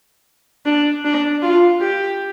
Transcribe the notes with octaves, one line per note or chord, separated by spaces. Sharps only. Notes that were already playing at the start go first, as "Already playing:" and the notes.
D4
D4
F4
G4